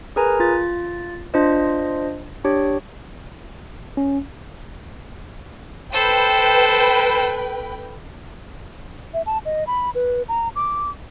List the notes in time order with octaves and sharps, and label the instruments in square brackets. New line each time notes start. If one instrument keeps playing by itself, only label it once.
[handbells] G#4 A#4 B4 G#5 A#5
F4 A6
D4 F4 C5 D#5
D4 G4 C#5
[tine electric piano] C#4
[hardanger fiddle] A4 C5 [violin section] B4 G5
[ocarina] E5
A5
D#5
B5
B4
A#5
D6